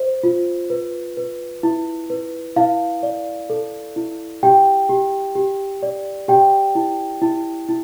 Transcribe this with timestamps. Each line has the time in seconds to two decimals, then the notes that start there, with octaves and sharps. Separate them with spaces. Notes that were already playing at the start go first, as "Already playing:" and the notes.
Already playing: C5
0.23 F4
0.70 B4
1.17 B4
1.63 E4
2.10 B4
2.56 E4 F5
3.03 D5
3.50 A4
3.96 E4
4.43 G4 G5
4.89 G4
5.35 G4
5.83 D5
6.28 G4 G5
6.75 E4
7.22 E4
7.69 E4